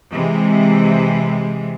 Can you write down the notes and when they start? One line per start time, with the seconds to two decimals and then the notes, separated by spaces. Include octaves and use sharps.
0.11 C3 E3 G#3